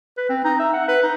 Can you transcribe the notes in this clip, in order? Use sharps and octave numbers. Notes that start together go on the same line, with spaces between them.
B4
C4
D#4
E5
F#5
B4
D#4